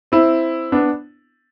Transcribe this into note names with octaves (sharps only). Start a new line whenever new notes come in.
C4 E4
B3 D4